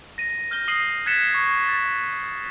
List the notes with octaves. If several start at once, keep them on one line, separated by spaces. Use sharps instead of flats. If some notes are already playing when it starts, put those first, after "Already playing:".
A#6 D#7
F6 G6 A#6 G7
D#6 A#6 C7 D#7 F#7
F#6 G#6 A6 B6 C#7 E7
C#6
A6